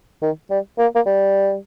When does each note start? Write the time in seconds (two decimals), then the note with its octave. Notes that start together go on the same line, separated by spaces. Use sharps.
0.22 D#3
0.50 G3
0.78 A#3
0.96 A#3
1.06 G3